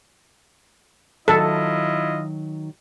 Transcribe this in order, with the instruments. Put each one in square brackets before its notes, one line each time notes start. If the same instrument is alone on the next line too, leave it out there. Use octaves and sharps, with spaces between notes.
[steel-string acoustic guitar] D#3 F#3 [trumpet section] E4 F4 D#5 [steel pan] A4